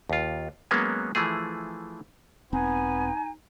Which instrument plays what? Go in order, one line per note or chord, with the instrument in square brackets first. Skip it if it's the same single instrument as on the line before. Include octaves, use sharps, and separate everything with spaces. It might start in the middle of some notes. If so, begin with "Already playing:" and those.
[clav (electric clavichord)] D#2 F4
F#3 G#3 A#3 B3 C#4
E3 F3 A3 G#4
[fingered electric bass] E1 C4 [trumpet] B3 [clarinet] D#4 [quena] G#5